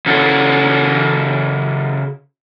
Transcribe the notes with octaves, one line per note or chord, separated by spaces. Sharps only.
C#3 E4 F#4 A4